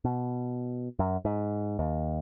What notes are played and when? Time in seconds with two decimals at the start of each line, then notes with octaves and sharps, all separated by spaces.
0.05 B2
0.99 F#2
1.25 G#2
1.79 D#2